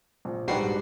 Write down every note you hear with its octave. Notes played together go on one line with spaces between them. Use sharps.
A#1
A#1 G#2 G3 D4 F#4 B4 G5 C7